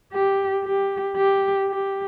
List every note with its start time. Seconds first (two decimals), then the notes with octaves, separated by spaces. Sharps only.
0.12 G4
0.65 G4
1.16 G4
1.69 G4